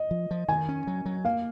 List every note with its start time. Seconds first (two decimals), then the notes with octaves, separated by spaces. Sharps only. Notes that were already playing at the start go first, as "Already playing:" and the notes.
Already playing: D#5
0.11 F3
0.31 F3
0.49 D#3 G#5
0.69 C#4
0.87 F#3
1.06 F#3
1.25 A#3 F5